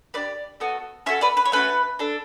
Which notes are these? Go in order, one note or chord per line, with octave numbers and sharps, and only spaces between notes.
D4 G4 B4 D5
B3 F#4 A4
C#4 F#4 A4 C#5 E5
B4 D5
B4
C#5
A3 C#4 F#4 B4
D4 A4